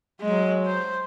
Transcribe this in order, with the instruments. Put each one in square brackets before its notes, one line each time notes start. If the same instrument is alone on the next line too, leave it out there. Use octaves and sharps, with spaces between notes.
[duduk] F#3 [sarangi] G#3
[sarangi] C5